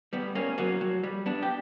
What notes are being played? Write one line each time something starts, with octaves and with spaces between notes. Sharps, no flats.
G3 B3
A#3 C#4
F#3 A#3
F#3
G3
B3 D4
G4